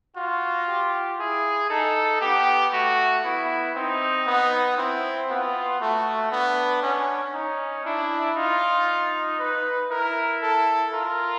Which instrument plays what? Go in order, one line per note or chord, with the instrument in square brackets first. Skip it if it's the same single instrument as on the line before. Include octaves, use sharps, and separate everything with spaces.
[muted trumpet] F4 [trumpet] F#4
[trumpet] G4
[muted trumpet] E4 [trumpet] G#4
[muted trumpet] D#4 [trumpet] A4
[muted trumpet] B3 [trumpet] G4
[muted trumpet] A3 [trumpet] F#4
[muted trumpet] B3 [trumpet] E4
[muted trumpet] C4 [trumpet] D#4
[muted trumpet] B3
[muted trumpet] C4 [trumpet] E4
[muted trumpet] B3 [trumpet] F4
[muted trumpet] A3 [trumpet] F#4
[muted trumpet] B3 [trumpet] D4
[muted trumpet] C#4
[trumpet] C#4 [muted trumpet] D#4
[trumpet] D4 [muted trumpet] E4
[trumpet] D#4 [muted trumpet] F4
[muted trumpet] B4
[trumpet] E4 [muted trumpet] A#4
[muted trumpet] A4
[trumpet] F4 [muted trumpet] A#4